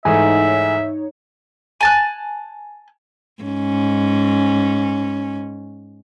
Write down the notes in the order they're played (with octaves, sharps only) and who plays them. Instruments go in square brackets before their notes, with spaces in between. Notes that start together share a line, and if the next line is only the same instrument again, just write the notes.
[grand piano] G#2 E3 A3 [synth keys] D#4 C#5 [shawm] E5 [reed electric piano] G#5
[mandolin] G#5 A5 F#6
[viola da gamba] G#2 C#4